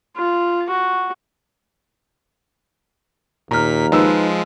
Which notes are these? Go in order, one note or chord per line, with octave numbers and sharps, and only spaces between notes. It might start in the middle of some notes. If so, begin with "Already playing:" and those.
F4
F#4
D#2 A#2 A#5 F6 B6
F3 G#3 D#4 B4 E6